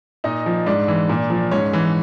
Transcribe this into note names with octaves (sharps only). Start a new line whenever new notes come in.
A#2 D#4 D#5
F3
G#2 D4 D5
E3
A#2
F3
G#2 C#4 C#5
E3